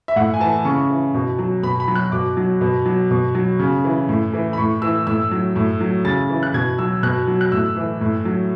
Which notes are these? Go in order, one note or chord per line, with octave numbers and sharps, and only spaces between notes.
E5
A2 F#5
G#5
E3 A5
C#3 C#6
E3
B2
F#3
B2 B5
B5
F#3
F#6
B2 D6
F#3
B2
F#3
B2
F#3
C#3
E3
A2
E3
B5
A2 C#6
E3 E6
A2 E6
F#3
A2
F#3
C#3 A6
E3
F#6
B2 G#6
F#3 E6
B2 F#6
F#3
F#6
A2 E6
E3
A2
F#3